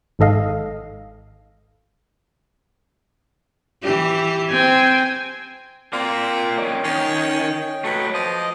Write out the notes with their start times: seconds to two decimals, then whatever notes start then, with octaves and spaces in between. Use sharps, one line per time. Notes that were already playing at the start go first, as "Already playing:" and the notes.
0.19 G#1 G#2 A4 D#5 F5
3.82 E3 G4
4.50 C4 G5 G#5
5.93 A#3 C4 F4 D5
6.58 A#3 C#4 C#5 D#5 G5
6.84 D#3 C#4
7.84 F#3 A3 B4
8.14 F3 D#5 D6